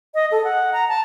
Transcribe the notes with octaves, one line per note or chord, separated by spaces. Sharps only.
D#5
A4
F#5
A#5
A5